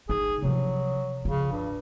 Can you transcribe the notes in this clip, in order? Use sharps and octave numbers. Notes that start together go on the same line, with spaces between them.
G1 D#4 G#4
C3 F3 F#3
C#3 F3 F4
G2